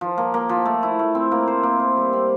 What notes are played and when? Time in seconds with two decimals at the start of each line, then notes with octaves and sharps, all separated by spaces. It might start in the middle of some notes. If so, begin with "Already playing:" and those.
0.01 F3
0.18 A#3
0.34 A#3
0.49 F3
0.66 A3
0.83 E4
0.99 A3
1.15 C4
1.32 A#3
1.47 C5
1.63 A#3
1.80 C5
1.97 G3
2.13 C4